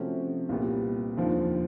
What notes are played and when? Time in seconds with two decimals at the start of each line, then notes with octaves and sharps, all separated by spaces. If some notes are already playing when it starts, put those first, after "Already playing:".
Already playing: C3 F3 A3 C#4 F#4
0.49 C2 A#2 G3 B3
1.17 F1 D#2 D3 F3